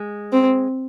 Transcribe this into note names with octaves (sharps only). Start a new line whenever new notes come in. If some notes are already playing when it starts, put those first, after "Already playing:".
Already playing: G#3
C4